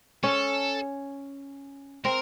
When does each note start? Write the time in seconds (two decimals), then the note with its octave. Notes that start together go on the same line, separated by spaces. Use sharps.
0.23 C#4 A4
2.04 C4 A#4